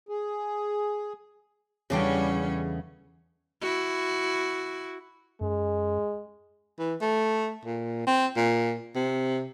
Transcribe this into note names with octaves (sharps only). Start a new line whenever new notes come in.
G#4
E2 C#3 E3 G3 A3 C#4 D4 G5
E4 F#4
F#2 G#3
E3
A3
A#2
C4
A#2
C3